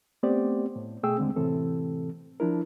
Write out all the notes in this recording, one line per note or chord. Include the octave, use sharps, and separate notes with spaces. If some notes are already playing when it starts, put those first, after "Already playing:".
A3 B3 C4 G4 C5 D5
A2
B2 A3 G#4 G5 E6
D#2 D3 G#3 C4
A2 C3 E3 C4 A4
F3 D4 E4 A#4